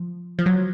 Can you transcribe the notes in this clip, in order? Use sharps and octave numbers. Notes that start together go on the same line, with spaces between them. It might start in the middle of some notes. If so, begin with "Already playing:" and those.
Already playing: F3
F3
F#3